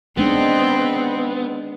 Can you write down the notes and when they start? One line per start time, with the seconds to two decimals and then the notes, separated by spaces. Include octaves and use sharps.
0.17 G#3 B3 C4 D4 D#4